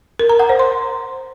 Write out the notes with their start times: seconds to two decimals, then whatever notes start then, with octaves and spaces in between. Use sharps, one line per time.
0.20 A#4
0.29 A#5
0.39 F#5
0.49 C5
0.59 C6